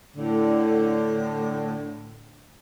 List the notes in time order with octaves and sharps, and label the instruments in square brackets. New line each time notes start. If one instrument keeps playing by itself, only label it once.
[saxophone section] A2 D3